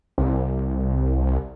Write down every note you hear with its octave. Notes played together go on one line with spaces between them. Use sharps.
C2